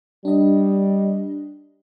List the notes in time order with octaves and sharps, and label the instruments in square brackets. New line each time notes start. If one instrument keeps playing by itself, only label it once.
[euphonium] G3 [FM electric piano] D4 D#5